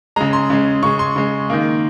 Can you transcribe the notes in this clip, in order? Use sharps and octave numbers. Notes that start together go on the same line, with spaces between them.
C#3 G#3 A#5
C6
C#3 G#3
C#3 G#3 C#6
C6
C#3 G#3
D#3 A#3